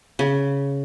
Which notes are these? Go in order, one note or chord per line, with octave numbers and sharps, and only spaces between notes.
C#3